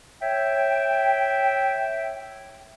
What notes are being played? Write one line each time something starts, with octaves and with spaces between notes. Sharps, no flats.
C#5 E5 G5